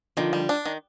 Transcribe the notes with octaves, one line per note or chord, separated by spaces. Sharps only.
D3 D#3 F3
G3
D4
D#3